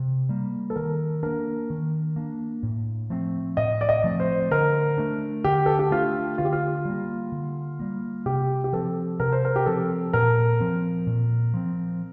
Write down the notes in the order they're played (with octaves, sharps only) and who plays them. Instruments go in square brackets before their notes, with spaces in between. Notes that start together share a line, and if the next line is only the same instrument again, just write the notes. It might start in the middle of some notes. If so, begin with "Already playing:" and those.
Already playing: [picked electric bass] C3
G3 A#3
[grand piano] A4
[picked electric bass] D#3 [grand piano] A#4
[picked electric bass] A#3 D4 [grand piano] A#4
[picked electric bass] D#3
A#3 D4
A2
F3 A3 C4
[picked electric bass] A2 [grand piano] D#5
[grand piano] D5
D#5
[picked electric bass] F3 A3 C4
[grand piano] C5
[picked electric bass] D3 [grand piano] A#4
[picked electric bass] A3 D4
[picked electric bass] D3 [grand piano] G4
[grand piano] A4
G4
[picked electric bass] A3 D4 [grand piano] F4
[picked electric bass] D3 [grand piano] F4
[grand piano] G4
F4
[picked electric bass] G3 A#3
D3
G3 A#3
[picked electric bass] C3 [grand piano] G4
[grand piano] G4
[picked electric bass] F3 C4 [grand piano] A4
[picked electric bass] C3 [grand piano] A#4
[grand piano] C5
A#4
G4
[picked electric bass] F3 C4 [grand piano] A4
[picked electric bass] A#2 [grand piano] A#4
[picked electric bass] F3 C4
A#2
F3 C4